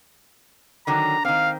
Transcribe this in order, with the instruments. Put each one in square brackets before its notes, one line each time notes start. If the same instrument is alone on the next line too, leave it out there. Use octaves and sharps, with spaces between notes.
[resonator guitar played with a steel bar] D3 D#3 F#3 [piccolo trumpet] A#5
[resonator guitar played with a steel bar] D#3 C4 [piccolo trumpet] F5